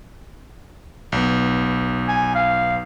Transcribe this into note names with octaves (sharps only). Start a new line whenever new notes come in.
B1 B3
G#5
F5